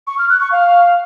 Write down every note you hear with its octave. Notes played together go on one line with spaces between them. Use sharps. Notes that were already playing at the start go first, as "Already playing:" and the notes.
C#6
F6
F#6
C#6
F5